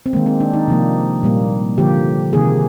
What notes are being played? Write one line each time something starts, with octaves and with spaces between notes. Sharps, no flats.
C4
D#3 G#3 A#3
C4
D4
D#4
C3 F3 A#3
A#2 G3 A#3
D3 F3 A#3 G4
C3 D#3 A#3 G#4